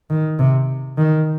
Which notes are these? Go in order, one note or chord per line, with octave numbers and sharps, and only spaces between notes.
D#3
C3
D#3